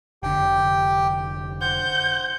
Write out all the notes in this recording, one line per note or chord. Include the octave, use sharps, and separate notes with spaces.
F1 D3 G4 G5
C5 F#5 G6